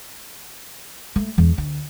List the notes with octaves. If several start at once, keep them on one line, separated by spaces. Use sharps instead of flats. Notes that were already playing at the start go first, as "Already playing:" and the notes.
A3
E2
D2